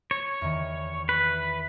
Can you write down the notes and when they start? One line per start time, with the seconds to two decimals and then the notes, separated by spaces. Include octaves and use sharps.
0.11 C#5
0.41 E2 D#3
1.09 B4